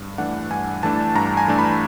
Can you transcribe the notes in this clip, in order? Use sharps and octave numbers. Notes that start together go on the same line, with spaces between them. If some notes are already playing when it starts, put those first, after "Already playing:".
Already playing: G2
E3 A3 D4 F#5
G2 G#5
E3 A3 D4 A5
G2 A#5
G#5
E3 A3 D4
B5